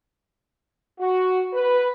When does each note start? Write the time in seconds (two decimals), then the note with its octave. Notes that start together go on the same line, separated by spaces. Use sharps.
0.99 F#4
1.53 B4